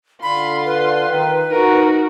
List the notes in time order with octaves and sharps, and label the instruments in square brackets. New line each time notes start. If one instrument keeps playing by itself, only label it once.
[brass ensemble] D3 [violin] F4 C6 [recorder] B5
[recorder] B4
[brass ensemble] D#3
[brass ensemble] D#4 [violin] F#4 A#4